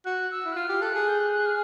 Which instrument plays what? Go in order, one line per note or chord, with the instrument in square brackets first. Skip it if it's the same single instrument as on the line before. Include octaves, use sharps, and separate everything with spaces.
[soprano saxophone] F#4 [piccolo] F#6
[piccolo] E6
[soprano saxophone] E4
[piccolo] F#6
[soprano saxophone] F4 [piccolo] F6
[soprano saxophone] G4
[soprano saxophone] A4 [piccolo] F#6
[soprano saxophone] G#4
[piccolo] G6
F#6
F#6
F6